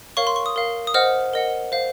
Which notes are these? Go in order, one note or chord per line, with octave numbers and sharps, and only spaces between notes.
A#4 C#5 F5 C#6
C6
C#6
D#6
A#4 F5
D#6
C5 D#5 F#5 F6
A#4 D#5 F#5
C5 F5